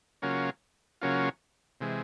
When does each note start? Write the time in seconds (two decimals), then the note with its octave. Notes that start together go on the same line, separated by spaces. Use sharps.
0.22 C#3 F#3 A#3 C#4 F4
1.01 C#3 F#3 A#3 C#4 F4
1.81 C3 E3 G#3